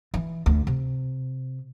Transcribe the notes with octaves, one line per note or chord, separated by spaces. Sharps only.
E3
D2
C3